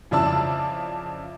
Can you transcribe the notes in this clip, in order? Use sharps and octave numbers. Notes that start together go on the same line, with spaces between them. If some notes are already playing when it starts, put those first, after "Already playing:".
F2 C#3 E4 D5 A5 E6